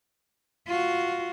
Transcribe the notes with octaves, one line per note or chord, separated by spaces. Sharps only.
F4 F#4